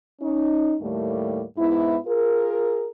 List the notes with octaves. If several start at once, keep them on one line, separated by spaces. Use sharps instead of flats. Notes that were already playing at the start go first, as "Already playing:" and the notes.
C#4 D#4
D#2 A2 G3 A3 A#3
G#2 B3 E4
F4 G#4 A#4